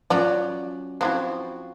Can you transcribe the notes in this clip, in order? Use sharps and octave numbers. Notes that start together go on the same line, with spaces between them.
F#3 C#4 F4 D5
F3 C4 E4 F#4